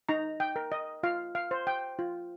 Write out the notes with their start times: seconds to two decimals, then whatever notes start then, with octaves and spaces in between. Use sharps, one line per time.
0.09 D#4 A#5
0.40 G5
0.56 A#4
0.72 D#5
1.03 F4 F5
1.35 F5
1.51 C5
1.67 G5
1.99 F4